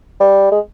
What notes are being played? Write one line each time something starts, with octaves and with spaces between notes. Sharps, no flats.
G3
G#3